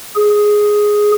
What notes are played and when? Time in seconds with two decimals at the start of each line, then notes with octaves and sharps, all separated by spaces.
0.16 G#4